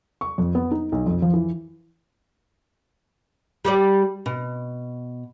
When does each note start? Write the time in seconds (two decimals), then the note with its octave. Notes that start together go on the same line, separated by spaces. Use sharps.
0.21 C#6
0.38 F2
0.55 B3
0.71 D#4
0.92 B1
1.07 F2
1.22 F3
1.34 E3
3.65 G3 G4 D5
4.26 B2